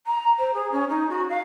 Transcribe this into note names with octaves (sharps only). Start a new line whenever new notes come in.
A#5
C5
G#4
C#4
D#4
F#4
F5